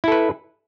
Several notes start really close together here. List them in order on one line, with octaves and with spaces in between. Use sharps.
E4 A4 B4